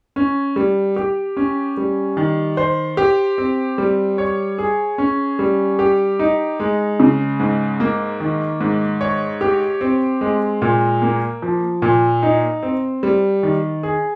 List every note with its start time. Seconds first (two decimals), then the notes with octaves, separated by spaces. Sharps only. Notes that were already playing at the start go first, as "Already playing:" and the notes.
0.16 C#4
0.56 G3
0.96 G4
1.37 C#4
1.77 G3
2.17 D#3
2.57 C5
2.97 G4
3.38 C4
3.78 G3
4.18 C#5
4.58 G#4
4.98 C#4
5.39 G3
5.79 G4
6.19 D#4
6.60 G#3
7.00 C#3
7.40 G#2
7.80 A#3
8.20 D#3
8.61 G#2
9.01 C#5
9.41 G4
9.81 C4
10.21 G#3
10.62 A#2
11.02 A#3
11.42 F3
11.82 A#2
12.23 D#4
12.63 C4
13.03 G3
13.43 D#3
13.83 G#4